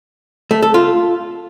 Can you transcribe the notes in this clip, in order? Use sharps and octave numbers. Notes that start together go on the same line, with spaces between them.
A3
A4
F4